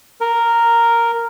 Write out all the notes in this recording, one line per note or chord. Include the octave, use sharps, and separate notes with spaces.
A#4